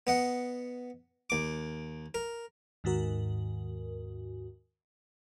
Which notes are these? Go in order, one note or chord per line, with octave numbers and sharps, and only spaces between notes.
B3 D#5 F#5
D#2 D6
A#4
D#2 G#2 D#3 F#4 A#4